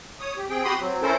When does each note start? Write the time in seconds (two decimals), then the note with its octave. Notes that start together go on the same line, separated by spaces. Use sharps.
0.20 C#5 D#6
0.37 G4
0.49 C4 G#4 G5
0.64 F#4 G4 B5 C6 D#6
0.80 F#3 C4
1.02 C#4 E4 A4 A#4 C5